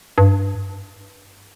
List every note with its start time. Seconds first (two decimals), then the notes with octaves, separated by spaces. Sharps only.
0.18 G2